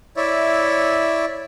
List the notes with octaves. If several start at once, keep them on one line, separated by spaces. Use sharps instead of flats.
E4 C#5 D5 E5